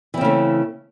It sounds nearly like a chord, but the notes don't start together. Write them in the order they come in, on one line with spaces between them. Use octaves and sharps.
E3 C4 C#3 A3